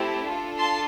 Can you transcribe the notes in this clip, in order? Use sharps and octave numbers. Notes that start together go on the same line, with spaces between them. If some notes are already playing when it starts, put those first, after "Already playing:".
Already playing: A3 C4 E4 G4
D4 F4 A4
A5 C6